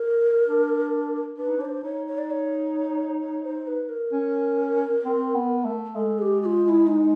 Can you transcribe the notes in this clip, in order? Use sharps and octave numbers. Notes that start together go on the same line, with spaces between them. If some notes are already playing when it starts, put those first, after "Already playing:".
Already playing: A#4
D4
D4 B4
D#4
D4 C#5
C5
D#4 C#5
C#5
D5
C#5
C#5
C5
B4
A#4
C#4
C4
B3
A3
G#3 A4
G#4
G4
G4
F4
F4
E4
D#4